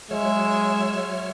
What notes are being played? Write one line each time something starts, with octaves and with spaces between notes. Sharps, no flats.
F#3 G#3 C#5 E5 F6